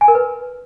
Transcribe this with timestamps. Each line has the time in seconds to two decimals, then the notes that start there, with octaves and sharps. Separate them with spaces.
0.01 G#5
0.08 A#4
0.15 B4